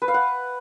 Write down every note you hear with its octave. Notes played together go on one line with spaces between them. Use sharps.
B4
F5
F#5